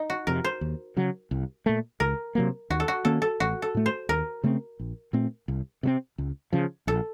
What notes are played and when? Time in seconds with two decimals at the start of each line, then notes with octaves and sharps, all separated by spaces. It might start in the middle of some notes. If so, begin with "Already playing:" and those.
Already playing: D#4
0.10 F#4
0.27 F2 C3 A#4
0.44 C5
0.61 D#2
0.97 C#3 F#3
1.31 C2
1.66 A#2 A3
2.00 C#2 A#4
2.35 C3 F#3 A#3
2.70 D#2 F#4
2.80 A4
2.88 F#4
3.05 D#3 A#3 C#4 A4
3.22 A4
3.40 A1 F#4
3.62 A4
3.75 A2 A3
3.86 C5
4.09 D#2 A#4
4.44 C#3 A3 C4
4.79 A#1
5.13 A#2 A3 C4
5.48 C2
5.83 C3 F#3 C4
6.18 C#2
6.53 C#3 F3
6.87 A#1 A4